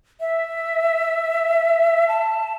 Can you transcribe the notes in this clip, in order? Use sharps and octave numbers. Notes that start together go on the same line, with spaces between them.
E5
A5